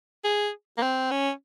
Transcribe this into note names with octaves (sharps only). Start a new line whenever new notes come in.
G#4
A#3
C4
C#4